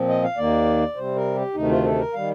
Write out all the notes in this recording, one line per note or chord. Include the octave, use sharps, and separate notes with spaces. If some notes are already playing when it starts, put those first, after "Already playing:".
Already playing: A#2 F3 C4
D#5
F5
D#2 D#3 A#3 D5
C3 G3 C4 C5
A#4
G4
D2 C3 D#3 A3 D#4
F4
A4
A#4
D#3 G3 F5